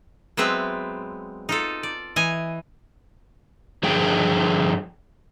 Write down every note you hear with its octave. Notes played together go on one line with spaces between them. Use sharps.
F#3 G#3 B3 C4 B4 E5
D#4 F4 A4
D5
E3 D#5 G#5
G2 D3 F3 G#4 G5